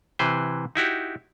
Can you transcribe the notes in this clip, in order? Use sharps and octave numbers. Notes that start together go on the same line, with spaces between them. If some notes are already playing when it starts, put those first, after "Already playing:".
C3 E3 B4 C5
D#4 E4 F#4 G4